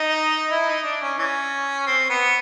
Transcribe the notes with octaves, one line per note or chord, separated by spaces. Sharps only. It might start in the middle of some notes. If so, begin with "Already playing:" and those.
Already playing: D#4
E4
D#4
D4
C#4
E3 C#4
C4
B3